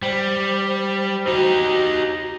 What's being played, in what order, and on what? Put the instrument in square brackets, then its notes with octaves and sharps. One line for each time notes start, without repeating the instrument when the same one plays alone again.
[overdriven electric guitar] G3 [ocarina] C5
[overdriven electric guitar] D#4 G4 [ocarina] F#4